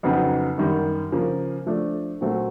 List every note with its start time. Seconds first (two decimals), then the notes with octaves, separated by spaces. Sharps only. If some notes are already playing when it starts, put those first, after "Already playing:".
0.03 F2 C#3 F#3 B3 D#4
0.58 F#2 D#3 G3
1.12 C#3 F3 A#3
1.67 F3 A3 D4
2.21 A#2 F#3 A3 C4